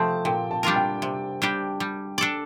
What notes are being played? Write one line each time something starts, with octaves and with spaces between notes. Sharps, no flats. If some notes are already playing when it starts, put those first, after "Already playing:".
Already playing: C3 F3 A3 C4 A5
A#2 G5
A5
G3 D4 F4 A#4
G5
C3
G3 D4 G4
G3
D4 A4 D5